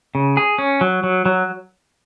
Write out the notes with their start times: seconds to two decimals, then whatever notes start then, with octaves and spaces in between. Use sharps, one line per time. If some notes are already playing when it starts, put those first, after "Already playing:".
0.15 C#3
0.37 G#4
0.58 C#4
0.81 F#3
1.04 F#3
1.26 F#3